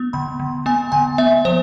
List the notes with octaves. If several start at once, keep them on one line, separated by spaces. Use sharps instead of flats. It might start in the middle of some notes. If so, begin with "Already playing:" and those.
Already playing: B3
D3 B5
D3
B3 G#5
D3 G#5
B3 E5
F3 C5